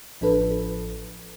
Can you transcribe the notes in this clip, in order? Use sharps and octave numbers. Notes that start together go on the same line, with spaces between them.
A1 F3 D4 A4 B4